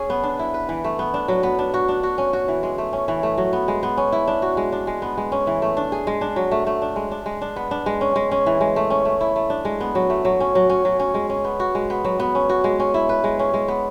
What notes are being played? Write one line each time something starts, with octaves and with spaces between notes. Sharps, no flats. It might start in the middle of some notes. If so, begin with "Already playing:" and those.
Already playing: C#4 G#4
B3
D4
E4
B4
E3
A3
B3
D4
F#3
B3
D4
F#4
D4
F#4
C#4
F#4
E3
G#3
A3
C#4
E3
A3
F#3
B3
G#3
B3
C#4
E4
D4
F#4
G#3
D4
G#3
B3
G#3
C#4
E3
A3
D4
G#4
G#3
D4
F#3
A3
A3
D4
G#3
D4
G#3
D4
B3
D4
G#3
C#4
G#3
C#4
E3
G#3
A3
C#4
A3
E4
A3
D4
G#3
B3
F#3
A3
F#3
C#4
F#3
C#4
F#3
C#4
G#3
C#4
B3
F#4
G#3
B3
F#3
B3
C#4
F#4
G#3
C#4
E4
B4
G#3
C#4
G#3
B3